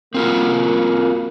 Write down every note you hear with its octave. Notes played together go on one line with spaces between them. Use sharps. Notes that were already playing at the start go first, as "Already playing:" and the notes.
A#3 C4 F4 F#4